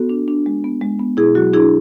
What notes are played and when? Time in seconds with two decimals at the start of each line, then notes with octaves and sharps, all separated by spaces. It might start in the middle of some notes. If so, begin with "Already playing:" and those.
Already playing: B3 F#4 A4
0.09 D4
0.28 D4
0.46 G#3
0.64 B3
0.81 G#3
0.99 B3
1.17 B2 E4 G#4
1.35 F#3 F#4
1.53 D4 E4 G#4